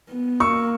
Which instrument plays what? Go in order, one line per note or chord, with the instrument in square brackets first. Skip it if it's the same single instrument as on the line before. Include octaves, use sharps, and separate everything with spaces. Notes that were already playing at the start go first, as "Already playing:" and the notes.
[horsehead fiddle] B3
[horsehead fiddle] A#3 [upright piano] C#6 E6